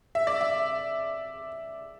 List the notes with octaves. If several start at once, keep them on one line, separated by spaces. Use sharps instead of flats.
E5
D5
E5